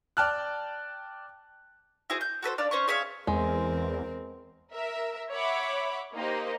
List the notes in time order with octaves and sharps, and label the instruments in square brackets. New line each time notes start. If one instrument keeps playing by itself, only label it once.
[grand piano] D5 G5 A5 F6 F#6
[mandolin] E4 F#4 G#4 C5
G6
F#4 A4 B4 C5
D4 D5 F5
C#4 C5 C#5 C#6
G#4 C#5 E5 F5
[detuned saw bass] E2 [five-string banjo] G#3 [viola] C4 A#4
[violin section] A#4 E5
C#5 E5 F#5 B5 D6
A#3 D#4 G4 C5 D#5